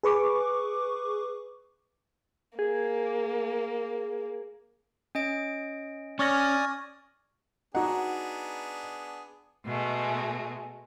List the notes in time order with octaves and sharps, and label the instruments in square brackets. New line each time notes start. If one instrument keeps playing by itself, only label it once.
[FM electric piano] G#4 B4 C#6 D6
[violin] A#3 [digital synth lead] G#4
[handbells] C#4 D#5 D7
[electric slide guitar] C#4 [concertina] D5 G#5 D#6 [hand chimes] C#6 F6 A#6
[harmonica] B3 D4 G#4 [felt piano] D#4 [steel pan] F#4 F#5
[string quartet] B2 G#3 A3